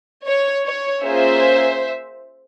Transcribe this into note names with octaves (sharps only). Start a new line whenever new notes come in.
C#5
C#5
A#3 C#4 F4 G#4 C5 E5